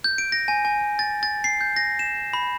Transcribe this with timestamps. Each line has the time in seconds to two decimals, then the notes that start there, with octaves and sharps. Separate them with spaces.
0.04 G6
0.18 D7
0.32 A#6
0.48 G#5
0.65 G#5
0.99 A6
1.23 A6
1.44 C7
1.61 G6
1.76 A#6
1.99 E7
2.33 B5